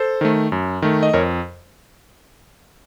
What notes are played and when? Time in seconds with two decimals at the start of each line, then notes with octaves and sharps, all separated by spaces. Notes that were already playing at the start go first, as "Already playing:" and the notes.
Already playing: A4 C5
0.21 D#3 A3
0.52 F#2
0.82 D#3 A3
1.03 D#5
1.13 F2 A#4 C#5